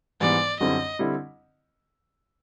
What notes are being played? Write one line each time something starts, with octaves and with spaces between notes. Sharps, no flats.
G#2 E3 G3 B3 D5
F#2 D3 G3 C4 E4 D#5
D3 G3 C4 E4